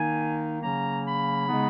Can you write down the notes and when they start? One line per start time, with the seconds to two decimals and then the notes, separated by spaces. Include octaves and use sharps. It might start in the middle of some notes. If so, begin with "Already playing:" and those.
Already playing: D#3 A#3 D#4 G#5
0.62 C#3 F#3 A#3 C#4 A#5
1.05 B5
1.48 C#3 G#3 B3 D#4